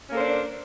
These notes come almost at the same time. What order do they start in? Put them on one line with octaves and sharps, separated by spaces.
C#4 A#3 A4 C5 D4